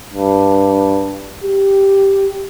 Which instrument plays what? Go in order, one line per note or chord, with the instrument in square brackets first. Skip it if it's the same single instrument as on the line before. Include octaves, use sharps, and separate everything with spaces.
[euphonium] G2
G4